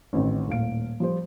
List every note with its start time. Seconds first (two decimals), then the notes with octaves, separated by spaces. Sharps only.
0.13 A1 A2 D#3 C4
0.48 D#1 A2 F5 D7
1.00 F3 G3 C5